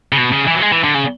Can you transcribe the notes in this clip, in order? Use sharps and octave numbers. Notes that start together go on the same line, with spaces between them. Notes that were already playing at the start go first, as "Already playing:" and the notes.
C#3
B2
C#3
E3
F#3
G#3
E3
D3
C#3